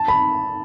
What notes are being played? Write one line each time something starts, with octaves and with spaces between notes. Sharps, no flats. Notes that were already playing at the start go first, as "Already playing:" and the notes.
Already playing: A5
B5